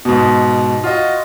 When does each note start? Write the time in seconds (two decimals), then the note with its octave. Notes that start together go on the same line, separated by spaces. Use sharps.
0.05 G#2 B2
0.84 F4 F#4 D#5